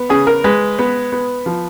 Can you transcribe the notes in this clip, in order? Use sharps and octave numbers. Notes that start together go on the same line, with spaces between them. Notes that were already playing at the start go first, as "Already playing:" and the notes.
Already playing: B3
C#3 G#4
A#4
G#3 B4
B3
B3
F3